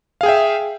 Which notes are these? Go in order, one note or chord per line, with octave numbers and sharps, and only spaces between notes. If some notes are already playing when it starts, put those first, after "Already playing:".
G#4 E5 F5 G5